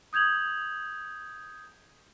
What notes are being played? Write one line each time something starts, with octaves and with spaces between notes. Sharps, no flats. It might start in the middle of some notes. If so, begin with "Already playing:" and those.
D#6 G6 G#6 F7 F#7